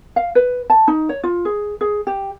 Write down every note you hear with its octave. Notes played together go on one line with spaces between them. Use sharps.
F5
B4
A5
D#4
C#5
F4
G#4
G#4
G4